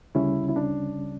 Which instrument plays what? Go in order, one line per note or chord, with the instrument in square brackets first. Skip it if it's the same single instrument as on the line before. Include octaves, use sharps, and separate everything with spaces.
[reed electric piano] D2 C#3 G3 C#4 [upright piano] E4
[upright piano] E4
D4